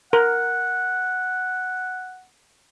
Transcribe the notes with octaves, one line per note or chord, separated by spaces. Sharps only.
A#4 F#5